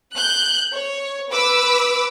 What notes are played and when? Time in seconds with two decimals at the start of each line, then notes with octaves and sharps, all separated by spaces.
0.13 F#6 G6
0.72 C#5
1.31 B4 D6 E6